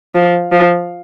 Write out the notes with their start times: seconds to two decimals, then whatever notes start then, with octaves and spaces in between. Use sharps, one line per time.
0.15 F3
0.52 F3